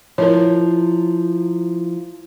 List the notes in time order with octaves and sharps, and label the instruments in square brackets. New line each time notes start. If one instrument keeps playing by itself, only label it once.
[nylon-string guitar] F3 [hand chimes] E4 C6 [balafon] A#4 C#5